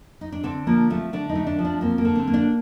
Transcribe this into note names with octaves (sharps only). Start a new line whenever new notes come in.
D#4
D4
D3 C4
F3 A#3
A3 C4
D3 D4
D#4
A3
D4
F3
D4
A#3 C4
A#3
D3
C4
A#3
D4